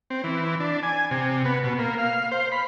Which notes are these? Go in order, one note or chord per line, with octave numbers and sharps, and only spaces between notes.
C4
E3
D4
G#5
C3
B3
B2
A#3
F5
C5
B5